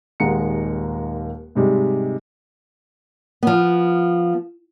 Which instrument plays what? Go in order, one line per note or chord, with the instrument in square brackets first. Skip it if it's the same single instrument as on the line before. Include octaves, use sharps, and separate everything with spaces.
[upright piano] D#1 D#2 G#3 F#5 A#5 C#7
G#2 C3 G3 G#3
[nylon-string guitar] F3 B3